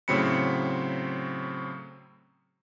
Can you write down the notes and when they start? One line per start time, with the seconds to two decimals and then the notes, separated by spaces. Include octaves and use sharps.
0.08 A2 C#3 F#3 C4 B5 C#7